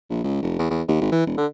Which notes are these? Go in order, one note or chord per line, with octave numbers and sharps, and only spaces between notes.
A#1
C#2
F1
E2
E2
D#2
G#1
E3
E1
D3